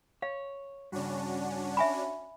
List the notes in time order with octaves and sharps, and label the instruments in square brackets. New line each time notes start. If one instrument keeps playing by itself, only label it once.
[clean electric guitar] C#5 [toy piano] F5
[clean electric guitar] G2 C#3 [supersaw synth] C#4 D4 F#4
[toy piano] E5 G#5 B5